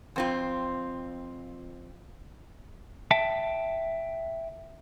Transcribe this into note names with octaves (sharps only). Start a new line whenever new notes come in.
F2 C4 F4
E5 G5 A5